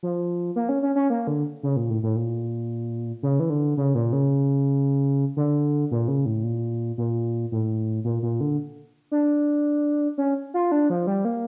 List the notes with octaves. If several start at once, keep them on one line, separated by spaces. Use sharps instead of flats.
F3
A#3
C#4
C#4
C#4
A#3
D3
C#3
A#2
A2
A2
A#2
C#3
E3
D3
C#3
A#2
C#3
D3
A#2
C#3
A2
A#2
A#2
A2
A#2
A#2
D3
D4
C#4
F4
D4
F3
G3
A#3